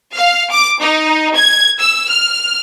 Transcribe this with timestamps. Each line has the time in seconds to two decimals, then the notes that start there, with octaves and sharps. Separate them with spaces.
0.15 F5
0.51 D6
0.82 D#4
1.37 G#6
1.79 E6
2.09 F6